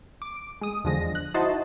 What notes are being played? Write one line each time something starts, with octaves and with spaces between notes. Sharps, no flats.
D6
G#3 D#6
E2 D3 F3 G#3 A#6
F#6
D#4 E4 F#4 C5 D#5 A5